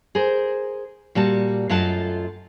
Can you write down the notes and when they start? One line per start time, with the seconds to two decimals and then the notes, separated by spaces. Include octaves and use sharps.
0.15 G#4 A#4 C5
1.15 A#2 G3 F#4 A5
1.70 F#2 A3 F4 D#5 F#5 A5